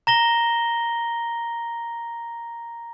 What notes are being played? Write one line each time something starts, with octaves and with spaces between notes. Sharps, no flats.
A#5 A#6 G7